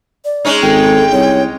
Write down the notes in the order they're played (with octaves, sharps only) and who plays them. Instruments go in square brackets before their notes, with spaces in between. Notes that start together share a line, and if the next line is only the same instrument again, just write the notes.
[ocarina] D5
[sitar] G#3 C#4 D#4
[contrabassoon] G#1 [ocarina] A4 [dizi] G5
[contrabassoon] C2 [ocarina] C#5